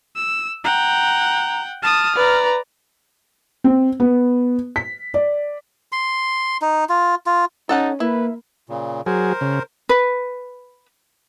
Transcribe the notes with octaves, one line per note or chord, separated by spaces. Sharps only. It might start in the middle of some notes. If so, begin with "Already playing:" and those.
E6
F#5 G5 A#5
A5 D#6 F6
B4 D5 A#5
C4
B3
B6
D5
C6
D#4
F4
F4
C#4 D#4 A4 F#5 A5
A#3 E4 B4
A#2 C#3
F#3 G#4 A#4 C5
C#3
B4